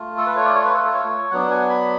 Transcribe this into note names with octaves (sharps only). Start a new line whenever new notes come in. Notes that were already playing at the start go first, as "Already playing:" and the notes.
Already playing: A3 F4
A4
B4
C#5
D5
C#5
B4
A4
A4
C#5
F#3 B3 D4 F#5
G#5
B5